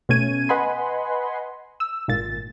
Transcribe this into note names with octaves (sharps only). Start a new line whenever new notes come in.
B2 A3 C#4 G#6 D#7
B4 D#5 F#5 G#5 B5 C6
E6
G#1 A#2 A6